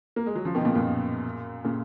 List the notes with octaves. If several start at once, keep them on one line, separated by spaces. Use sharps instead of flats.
A#3
G#3
F#3
C#3 F3
B2 D#3
A#2 C#3
F#2 A#2
A#2 C#3